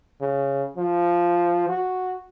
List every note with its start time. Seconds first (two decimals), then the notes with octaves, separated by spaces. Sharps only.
0.22 C#3
0.77 F3
1.69 F#4